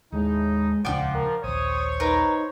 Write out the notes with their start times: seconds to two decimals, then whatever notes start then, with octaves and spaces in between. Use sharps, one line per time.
0.12 D#2 A2 G#3 D#4
0.85 D#1 C#2 F3 D4 D5 F#5 G5 D6
1.15 A#4
1.44 A#1 D#2 C5 C#5 D#6
2.00 D#4 A#4 B4